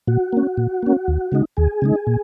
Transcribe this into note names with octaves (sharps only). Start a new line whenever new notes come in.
A#2 F#4
A#3 C#4
A#2
A#3 C#4
D#2
C#3 G#3 D#4
D#2 G#4
C#3 G#3 D#4
A#2